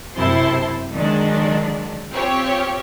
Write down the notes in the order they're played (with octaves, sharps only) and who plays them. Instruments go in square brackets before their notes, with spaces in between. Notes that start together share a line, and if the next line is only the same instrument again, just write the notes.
[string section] F#2 C3 E4 C5 A5 C6
D3 D#3 F#3 G#3 D4
C4 F4 G4 C#5